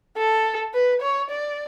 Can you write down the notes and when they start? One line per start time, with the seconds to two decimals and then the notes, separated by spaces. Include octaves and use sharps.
0.18 A4
0.74 B4
1.02 C#5
1.30 D5